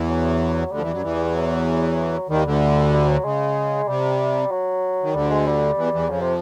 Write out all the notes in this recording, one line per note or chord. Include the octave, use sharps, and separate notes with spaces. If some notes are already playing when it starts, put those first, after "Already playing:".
Already playing: E2 E3
F#3
D2 D3 G3
F3
E2 E3
F#2 F#3
E2 E3
F#3
D#2 D#3 G3
D2 D3
G3
F#3
C#3 G#3
C3 G3
F#3
D#3
D2 D3 G3
G#3
G3
E2 E3
E2 E3
F2 C#3 F3
C3